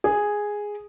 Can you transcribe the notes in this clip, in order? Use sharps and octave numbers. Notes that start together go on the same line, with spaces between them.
G#4